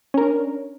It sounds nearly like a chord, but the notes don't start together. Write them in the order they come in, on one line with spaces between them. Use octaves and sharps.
C#4 A#4 D4